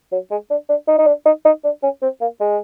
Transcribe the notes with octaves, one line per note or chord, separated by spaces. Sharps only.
F#3
G#3
D4
D4
D#4
D#4
D4
D#4
D#4
D4
C#4
C4
A#3
G#3